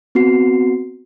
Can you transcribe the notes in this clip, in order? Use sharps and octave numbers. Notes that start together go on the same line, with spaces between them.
B3 C4 F#4 C7